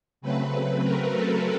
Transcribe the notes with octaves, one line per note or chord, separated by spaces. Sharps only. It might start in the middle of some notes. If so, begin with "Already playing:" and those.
C#3 F#3 A3 C4 B4
A#4
A4